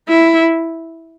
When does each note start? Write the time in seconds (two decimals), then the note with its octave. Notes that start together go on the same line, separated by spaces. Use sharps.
0.09 E4